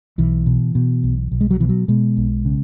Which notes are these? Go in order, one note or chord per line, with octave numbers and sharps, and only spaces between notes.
B1 E3
B2
B2
B1
B1
G#3
F#3
B2 E3
F#3
B2 G#3
B1
C#3